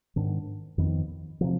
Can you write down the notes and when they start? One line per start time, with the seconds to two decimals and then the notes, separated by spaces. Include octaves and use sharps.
0.16 G#2 D#3 B3 D4
0.78 F2 D#3 B3
1.41 C3 F3